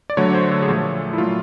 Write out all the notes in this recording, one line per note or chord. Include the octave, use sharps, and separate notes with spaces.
D5
D3 F#3 A3 C#5
C5
A4
G#4
A#2 F3 A3 A4
E4
A#2 F#3 A3 F4